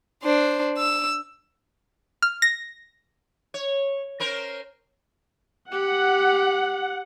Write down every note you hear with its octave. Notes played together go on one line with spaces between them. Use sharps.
D4 C5
E6
F6
A#6
C#5
C#4 A#4 C5
G4 F#5